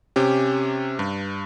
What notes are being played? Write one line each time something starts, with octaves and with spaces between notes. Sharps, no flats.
C3 C#4 G4
G2